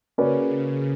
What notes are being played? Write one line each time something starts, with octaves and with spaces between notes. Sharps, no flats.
C#3 A#3 C#4 F#4 B4 D5